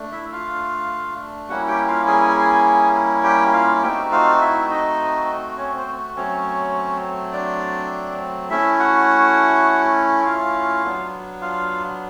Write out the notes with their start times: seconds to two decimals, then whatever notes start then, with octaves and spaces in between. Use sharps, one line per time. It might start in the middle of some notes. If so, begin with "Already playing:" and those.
Already playing: A3 D4
0.12 E4 E5
0.32 F4 F5
1.49 G3 A#3 C#4 E4 F#4 F#5
1.68 G4 G5
1.88 F4 F5
2.07 G#4 G#5
3.24 G4 G5
3.53 F4 F5
3.82 A3 C4 D#4 F#4 G4 G5
4.12 F4 F5
4.41 E4 E5
4.69 D#4 D#5
5.58 C#4 C#5
5.77 C4 C5
6.16 F#3 A3 C4 C#4 C#5
7.33 D4 D5
8.50 A3 C#4 E4 E5
8.79 F#4 F#5
10.26 F4 F5
10.84 F#3 B3 D4
11.41 F4 F5